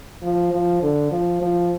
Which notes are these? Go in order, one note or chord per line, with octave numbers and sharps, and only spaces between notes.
F3
F3
D3
F3
F3